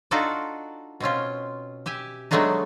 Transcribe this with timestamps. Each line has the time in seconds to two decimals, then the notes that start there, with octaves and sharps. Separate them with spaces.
0.11 D4 D#4 F4 F#4 A4 D5
1.00 B2 C4 C#4 F4
1.86 G4 E5 G#5
2.31 F#3 G#3 A3 B3 D4 D#4